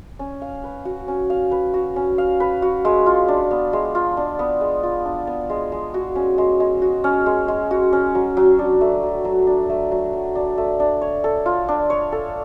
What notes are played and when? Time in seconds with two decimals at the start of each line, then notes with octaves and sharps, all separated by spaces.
0.19 C#4
0.42 F5
0.64 B4
0.85 F#4
1.08 C#4
1.30 F5
1.51 B4
1.74 F#4
1.96 C#4
2.18 F5
2.40 B4
2.62 F#4
2.85 G#3
3.06 F4
3.28 D4
3.51 B3
3.73 G#3
3.95 F4
4.17 D4
4.39 B3
4.61 G#3
4.83 F4
5.05 D4
5.27 B3
5.50 G#3
5.72 G#3
5.94 F#4
6.16 C#4
6.38 G#3
6.60 G#3
6.82 F#4
7.04 C#4
7.26 G#3
7.48 G#3
7.71 F#4
7.93 C#4
8.15 F#3
8.37 F#3
8.59 D4
8.81 A3
9.03 F#3
9.25 F#3
9.47 D4
9.69 A3
9.91 F#3
10.13 F#3
10.35 D4
10.58 A3
10.80 D4
11.01 C#5
11.24 A4
11.46 F4
11.68 D4
11.90 C#5
12.12 A4